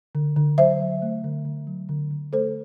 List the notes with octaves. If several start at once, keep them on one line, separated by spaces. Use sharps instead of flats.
D3
D3
F#3 C5 E5
F#3
A3
D3
D3
F#3
D3
D3
A3 A4 C5